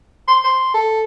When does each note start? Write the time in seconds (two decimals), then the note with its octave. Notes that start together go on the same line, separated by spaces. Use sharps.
0.28 C6
0.44 C6
0.74 A4